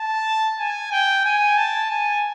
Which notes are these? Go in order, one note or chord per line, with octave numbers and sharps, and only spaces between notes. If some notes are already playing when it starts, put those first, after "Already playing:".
Already playing: A5
G#5
G5
G#5
A5
G#5